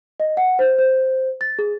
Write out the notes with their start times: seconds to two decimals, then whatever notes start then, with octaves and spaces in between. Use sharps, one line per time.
0.20 D#5
0.37 F#5
0.59 C5
0.79 C5
1.41 A6
1.59 G#4